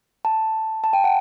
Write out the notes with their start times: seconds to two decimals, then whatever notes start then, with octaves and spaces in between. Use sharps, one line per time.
0.25 A5
0.84 A5
0.93 G5
1.04 F#5